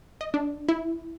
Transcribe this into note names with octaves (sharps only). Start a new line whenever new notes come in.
D#5
D4
E4